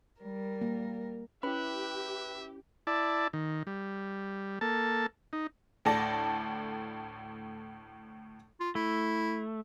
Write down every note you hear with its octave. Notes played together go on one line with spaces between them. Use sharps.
G3 A#4
A#3
C#4 E4 G4 B4 E5 B5
E4 D5 A5
D#3
G3
A#3 A4 A5
D#4
D2 A2 A4 D5 A5 A#6
F4
A3 E4